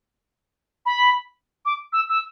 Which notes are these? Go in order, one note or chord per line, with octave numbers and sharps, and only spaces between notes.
B5
D6
E6
E6